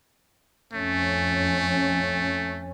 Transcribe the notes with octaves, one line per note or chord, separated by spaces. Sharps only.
F2 A3 C#4